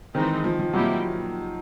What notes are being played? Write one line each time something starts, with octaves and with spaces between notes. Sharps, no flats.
D#3 E3 G#3 C4 D#4
F3
F3
A#2 F#3 G3 C4 E4 G4